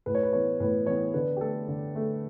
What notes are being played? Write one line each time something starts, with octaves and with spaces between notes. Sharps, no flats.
A2 B4
C#5
B4
E3 B3 C#5
A2 B4
E3 B3 C#5
D3 B4
G4
A3 A4
D3
A3